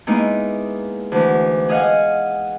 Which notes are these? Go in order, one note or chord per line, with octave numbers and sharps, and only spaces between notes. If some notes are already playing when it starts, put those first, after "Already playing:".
G#3 A#3 B3 D#4 E4
D2 E3
G#4 D#5 F5 F#5 G#5